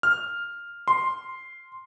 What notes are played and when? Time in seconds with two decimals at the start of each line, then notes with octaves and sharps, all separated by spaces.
0.03 F6
0.88 C6